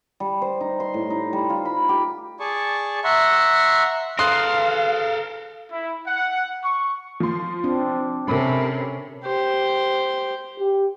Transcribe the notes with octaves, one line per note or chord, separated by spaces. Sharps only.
G3
C5
D#4
C6
A2
D#4
G3
F4
B5
G4
G#4 D5 A5 C#6
E5 F#5 A#5 C6 C#6
A4 A#4 F5 C6 D#6 F#6
E4
F#5
C#6
F3 C6
C4 D4
C3 C#4 A4 A#4 B5
G4 C5
G4